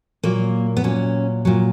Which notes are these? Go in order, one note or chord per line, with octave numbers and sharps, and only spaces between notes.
A#2 F#3 A#3
B3
A#2 F#3 C#4
A#2 F#3